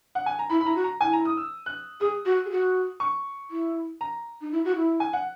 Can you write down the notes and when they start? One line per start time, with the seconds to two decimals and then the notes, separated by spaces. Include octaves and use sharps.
0.15 F#5
0.26 G#5
0.39 A#5
0.49 E4 B5
0.61 B5
0.65 E4 A#5
0.75 F#4
0.84 A#5
1.00 E4 G#5
1.13 A#5
1.25 D#6
1.37 E6
1.66 F#6
2.00 G#4 D#6
2.25 F#4
2.45 G#4
2.51 F#4
3.00 C#6
3.50 E4
4.01 A#5
4.41 D#4
4.51 E4
4.64 F#4
4.76 E4
5.00 G#5
5.13 F#5